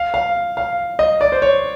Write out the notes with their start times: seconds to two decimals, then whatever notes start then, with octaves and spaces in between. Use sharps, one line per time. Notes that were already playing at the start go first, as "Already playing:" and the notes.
Already playing: F5
0.14 F5
0.57 F5
0.99 D#5
1.21 D5
1.32 C5
1.42 C#5